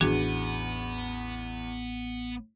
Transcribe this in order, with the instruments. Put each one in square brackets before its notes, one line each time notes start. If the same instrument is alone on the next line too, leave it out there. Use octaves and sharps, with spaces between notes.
[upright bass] A1 [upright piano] E2 [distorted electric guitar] B3 [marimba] D4 F#4 G#4